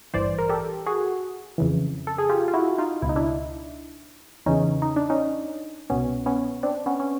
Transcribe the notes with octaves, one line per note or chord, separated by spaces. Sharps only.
A1 G2 E3 C5 D5
A#4
G4 A4
F#4 G#4
F2 C#3 E3
A4
G#4
F4 G4
F4
E4 F#4
D#4 F4
C#2 B2 E4
D#4
D4 E4
E2 C#3 E3 C#4 D#4
D#4
D4
C#4 D#4
C2 B2 B3 C#4
B3 C#4
C4 D4
B3 C#4
C#4